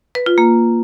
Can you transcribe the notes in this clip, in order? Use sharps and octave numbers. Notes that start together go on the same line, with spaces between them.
B4
F4
A#3